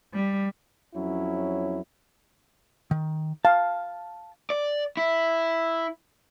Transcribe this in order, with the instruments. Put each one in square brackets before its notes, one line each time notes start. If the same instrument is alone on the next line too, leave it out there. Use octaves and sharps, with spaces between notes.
[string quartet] G3
[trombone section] F2 F#3 C#4 E4
[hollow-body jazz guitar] D#3
[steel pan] F5 [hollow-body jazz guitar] A5
[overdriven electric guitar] D5
E4